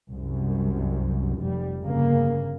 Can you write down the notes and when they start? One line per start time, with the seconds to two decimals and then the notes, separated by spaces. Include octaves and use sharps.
0.11 C2 F#2
1.40 F1 G3
1.81 G1 C#3 A#3